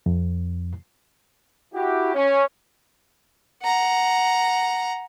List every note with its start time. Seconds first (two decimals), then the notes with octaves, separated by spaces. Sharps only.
0.06 F2
1.75 E4 F#4 G4
2.15 C#4
3.63 F#5 A#5